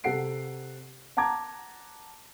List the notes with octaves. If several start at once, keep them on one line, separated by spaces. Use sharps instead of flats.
C3 A4 F#5 C7 D7
F#5 A5 A#5 D6 G#6